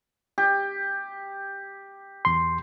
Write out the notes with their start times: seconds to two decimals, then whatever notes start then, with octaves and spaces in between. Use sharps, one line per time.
0.38 G4
2.25 E2 C6